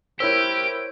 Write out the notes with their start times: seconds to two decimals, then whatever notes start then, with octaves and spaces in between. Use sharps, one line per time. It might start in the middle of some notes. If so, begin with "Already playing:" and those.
0.20 E4 G4 A#4 C5 C#5 E6 D7